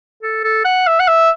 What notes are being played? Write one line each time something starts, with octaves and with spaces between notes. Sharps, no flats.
A4
A4
F#5
E5
F#5
E5